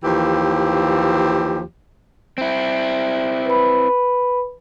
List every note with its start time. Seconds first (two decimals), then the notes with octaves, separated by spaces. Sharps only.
0.04 D#2 E3 F3 G4
2.38 C4 E4
3.46 B4 B5